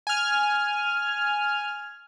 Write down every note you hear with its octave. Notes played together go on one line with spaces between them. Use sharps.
G#5 F6